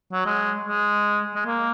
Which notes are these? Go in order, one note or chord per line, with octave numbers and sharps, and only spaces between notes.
F#3
G#3
G#3
G#3
A#3